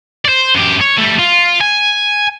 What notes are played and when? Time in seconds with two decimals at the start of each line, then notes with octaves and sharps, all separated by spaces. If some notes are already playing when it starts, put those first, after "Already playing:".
0.25 C5 D5
0.55 F#2 G4
0.81 C#5
0.98 G3 A3
1.19 F4
1.60 G#5